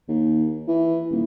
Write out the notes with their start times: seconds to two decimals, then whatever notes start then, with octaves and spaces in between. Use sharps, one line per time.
0.08 D#2
0.68 E3
1.11 D#1